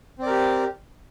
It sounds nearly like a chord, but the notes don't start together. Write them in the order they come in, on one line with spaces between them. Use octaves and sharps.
C4 D5 A#4 G4